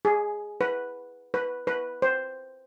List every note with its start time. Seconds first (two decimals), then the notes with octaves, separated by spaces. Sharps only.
0.05 G#4
0.61 B4
1.34 B4
1.67 B4
2.02 C5